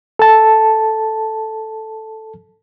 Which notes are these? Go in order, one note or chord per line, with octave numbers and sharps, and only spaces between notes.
A4 A5